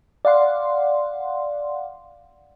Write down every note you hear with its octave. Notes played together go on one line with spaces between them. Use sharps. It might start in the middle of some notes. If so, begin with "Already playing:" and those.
D5 F5 F#5 C6